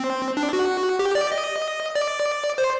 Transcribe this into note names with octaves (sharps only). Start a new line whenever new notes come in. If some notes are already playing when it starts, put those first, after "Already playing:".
Already playing: C4
D4
F#4
G4
D5
D#5
D5
C5